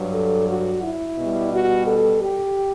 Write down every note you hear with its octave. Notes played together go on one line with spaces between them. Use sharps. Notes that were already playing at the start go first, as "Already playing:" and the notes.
Already playing: G2 F#3
A4
F#4
E4
B2 G3
F#4
A4
G4